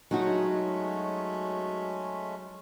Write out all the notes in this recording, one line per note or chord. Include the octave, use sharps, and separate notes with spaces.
F#3 G#3 A3 C#4 D#4 F#4